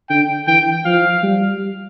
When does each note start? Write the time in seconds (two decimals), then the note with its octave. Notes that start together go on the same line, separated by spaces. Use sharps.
0.10 D3 G5
0.48 E3 G5
0.85 F3 F5
1.23 G3